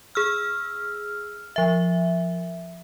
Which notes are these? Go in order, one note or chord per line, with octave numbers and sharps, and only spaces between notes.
G#4 E6 F6
F3 E5